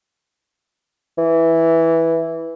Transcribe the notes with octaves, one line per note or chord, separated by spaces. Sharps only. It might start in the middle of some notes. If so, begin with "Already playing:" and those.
E3